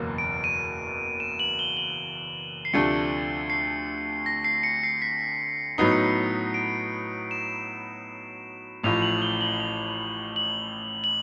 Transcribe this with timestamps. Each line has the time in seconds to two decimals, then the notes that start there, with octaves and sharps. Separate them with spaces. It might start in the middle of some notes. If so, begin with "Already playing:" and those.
Already playing: F#1 E2 B2 F#3 A#3
0.18 D7
0.44 D#7
1.20 E7
1.39 F#7
1.59 G7
1.77 F#7
2.65 C7
2.73 D2 C3 F3 A3 D4 C#7
3.50 C7
4.26 A#6
4.44 C7
4.63 C#7
4.83 C7
5.02 B6
5.78 A2 F#3 B3 D#4 C7
5.92 C#7
6.04 C7
6.54 D7
7.31 E7
8.83 A1 A2 F3 F7
9.02 F#7
9.22 G7
9.41 F#7
9.60 F7
10.36 F#7
11.04 F#7